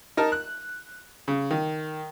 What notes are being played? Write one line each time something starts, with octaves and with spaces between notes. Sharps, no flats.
D#4 A#4 A5
F#6
C#3
D#3